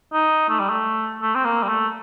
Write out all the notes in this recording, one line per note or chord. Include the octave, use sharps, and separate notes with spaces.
D#4
A3
G3
A3
A3
C4
A#3
G3
A3